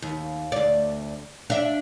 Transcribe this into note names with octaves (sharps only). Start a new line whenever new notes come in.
D#2
D2 D5
D4 E5